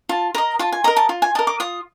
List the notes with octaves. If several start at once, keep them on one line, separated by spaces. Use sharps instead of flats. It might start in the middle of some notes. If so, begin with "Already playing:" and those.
F4 A5
A#4 D#5 A#5
F4 A5
G#5
A#4 D#5 A#5
A5
F4
G#5
A#4 D#5 A5
D6
F4 D#6